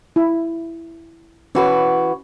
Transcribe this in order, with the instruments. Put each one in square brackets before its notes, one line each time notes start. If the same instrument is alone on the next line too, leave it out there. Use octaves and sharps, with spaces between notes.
[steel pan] E4
[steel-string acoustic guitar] E3 F#4 B4 [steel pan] C#4